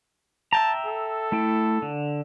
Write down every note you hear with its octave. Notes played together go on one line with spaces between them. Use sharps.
E5 G5 A5 A#5
A4
A3 E4 G5
D3